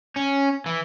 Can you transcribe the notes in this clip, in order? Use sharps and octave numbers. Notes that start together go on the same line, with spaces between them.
C#4
E3